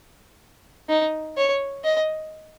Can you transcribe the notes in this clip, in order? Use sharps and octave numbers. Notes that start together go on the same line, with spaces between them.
D#4
C#5
D#5